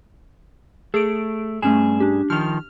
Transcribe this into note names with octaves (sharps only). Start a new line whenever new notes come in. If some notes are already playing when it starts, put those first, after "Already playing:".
A3 G#4 D7
G2 A3 C#4 G#4 E7
D4 G4
D#3 F3 F6 F7